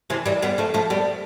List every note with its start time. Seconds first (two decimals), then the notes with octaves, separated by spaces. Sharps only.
0.10 C3 E3
0.26 E3 G3
0.42 G3 B3
0.58 F3 A3
0.74 F3 A3
0.90 G3 B3